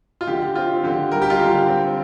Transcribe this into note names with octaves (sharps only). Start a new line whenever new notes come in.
F4
D3 G4
C4 F4
D3 G4
G3 A#4
G4
F4
D3 G4
C4